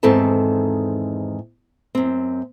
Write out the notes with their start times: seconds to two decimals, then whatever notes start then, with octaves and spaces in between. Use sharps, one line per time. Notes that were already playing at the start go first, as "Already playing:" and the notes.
0.03 E2 G#2 D#3 C4 A4 A5
1.95 F#2 C4